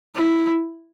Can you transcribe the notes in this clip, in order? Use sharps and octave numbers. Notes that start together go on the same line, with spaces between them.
E4